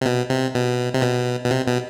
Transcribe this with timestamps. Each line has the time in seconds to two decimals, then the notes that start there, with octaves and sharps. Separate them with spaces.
0.01 C3
0.05 B2
0.30 C3
0.55 B2
0.94 C3
1.02 B2
1.44 B2
1.51 C3
1.67 B2